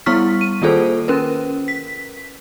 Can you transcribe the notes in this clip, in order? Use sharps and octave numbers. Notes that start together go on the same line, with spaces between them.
G3 B3 E4 C#6 F6 B6
D#7
D#3 A#3 F4 G#4 A4 C5
C#4 A#4 B4
B6